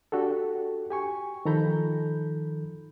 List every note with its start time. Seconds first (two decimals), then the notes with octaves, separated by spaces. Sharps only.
0.12 D4 F#4 G4 A4
0.91 G4 G#5 C#6
1.45 D#3 F3 A4 A#5 B5 G6